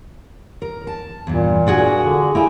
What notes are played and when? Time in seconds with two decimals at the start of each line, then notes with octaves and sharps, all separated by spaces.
0.62 A#4
0.87 A5
1.27 E2 G2 A#2
1.67 D4 F#4 G#4
2.01 D3
2.35 A#3 E4 G4 G#5